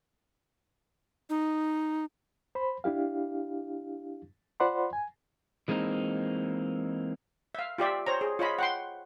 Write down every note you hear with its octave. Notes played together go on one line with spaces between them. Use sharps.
D#4
C5 B5
D4 E4 G4 F5
F4 C5 D5 F#5 B5 C6
G#5
E3 G#3 A#3 C4 D#4
E5 F5
F4 G4 D5 E5
C5 C#5 A#5
G#4
F4 C#5 D#5 B5
F#5 G5 C6